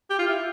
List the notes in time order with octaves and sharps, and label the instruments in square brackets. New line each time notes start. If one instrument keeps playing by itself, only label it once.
[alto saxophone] G4
F4
E4